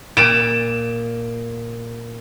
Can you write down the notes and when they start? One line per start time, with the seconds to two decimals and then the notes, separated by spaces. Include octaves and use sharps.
0.17 A#2 D7 E7